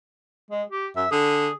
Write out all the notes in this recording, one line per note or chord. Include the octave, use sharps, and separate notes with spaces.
G#3
G4
F#2 E5
D3 G#4